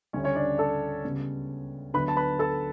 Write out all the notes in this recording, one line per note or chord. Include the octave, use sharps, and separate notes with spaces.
D2 C#3 G3 C#4 C#5
C#4 C#5
D4 D5
A4 A5
C#2 C#3 G3 B3
D2 D3 F#3 B3 B4 B5
A5
B4 B5
A4 A5